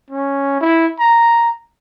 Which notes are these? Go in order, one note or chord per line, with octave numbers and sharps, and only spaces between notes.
C#4
E4
A#5